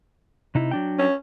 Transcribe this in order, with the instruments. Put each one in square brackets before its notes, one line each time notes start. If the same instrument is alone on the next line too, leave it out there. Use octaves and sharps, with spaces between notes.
[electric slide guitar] C3 D#4 E4
F#3 D4 G5
[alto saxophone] C#4